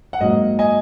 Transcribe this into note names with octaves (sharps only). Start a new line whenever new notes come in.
F#5
G#2 F#3 A#3 D#5
D#5 G#5